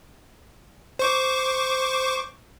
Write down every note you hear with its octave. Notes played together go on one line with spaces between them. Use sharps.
C5 C#6 D6